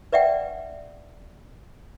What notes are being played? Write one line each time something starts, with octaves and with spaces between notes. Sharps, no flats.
B4 D5 E5 F#5 G5